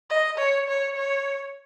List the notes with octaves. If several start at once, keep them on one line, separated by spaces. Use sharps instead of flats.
D#5
C#5
C#5
C#5